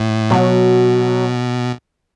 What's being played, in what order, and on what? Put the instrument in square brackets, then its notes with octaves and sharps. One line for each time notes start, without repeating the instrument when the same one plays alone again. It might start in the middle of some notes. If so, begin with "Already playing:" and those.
Already playing: [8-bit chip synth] A2
[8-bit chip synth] B2 [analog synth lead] F#3